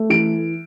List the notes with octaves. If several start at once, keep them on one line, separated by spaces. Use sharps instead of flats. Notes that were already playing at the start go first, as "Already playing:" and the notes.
Already playing: A3
E3 D7